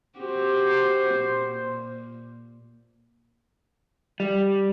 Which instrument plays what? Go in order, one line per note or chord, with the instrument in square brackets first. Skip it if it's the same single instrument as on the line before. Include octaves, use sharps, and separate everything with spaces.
[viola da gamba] C4 F#4 G4 [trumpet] C5
[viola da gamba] A#2
[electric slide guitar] G3